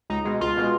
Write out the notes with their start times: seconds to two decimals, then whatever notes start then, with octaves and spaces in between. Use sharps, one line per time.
0.10 C#2 D#4
0.25 B2 G#3
0.41 C#2 F4
0.57 B2 G#3